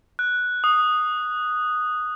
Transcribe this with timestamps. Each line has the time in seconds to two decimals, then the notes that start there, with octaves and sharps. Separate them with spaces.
0.19 F#6
0.64 D#6